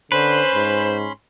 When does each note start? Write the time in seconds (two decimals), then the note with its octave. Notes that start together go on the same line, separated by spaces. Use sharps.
0.12 D3 C#4 B4 C5 B5 C6
0.55 G#2